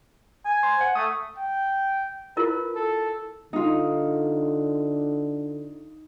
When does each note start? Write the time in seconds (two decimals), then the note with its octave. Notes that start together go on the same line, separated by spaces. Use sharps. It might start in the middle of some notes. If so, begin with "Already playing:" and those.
0.45 G#5
0.63 C5
0.81 F#5
0.95 A3 D#6
1.37 G5
2.37 E4 F4 A#4 B4
2.75 A4
3.53 D3 D#4 F4